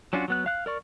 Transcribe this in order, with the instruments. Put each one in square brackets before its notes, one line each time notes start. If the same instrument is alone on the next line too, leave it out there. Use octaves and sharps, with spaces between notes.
[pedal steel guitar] F#3 C#4 D4 F4 F#4
F#3 B3 F#6
F5 F#6
A#4 D5 C#6